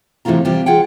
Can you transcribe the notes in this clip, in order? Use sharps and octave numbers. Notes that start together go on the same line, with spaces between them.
A2 C3 E3 A3 F4 A#5
C3 E3 G3 F4 G4
F4 G#4 F#5 G5